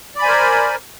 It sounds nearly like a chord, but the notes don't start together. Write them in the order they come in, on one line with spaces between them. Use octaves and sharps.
D5 B5 G#5 C5 A#4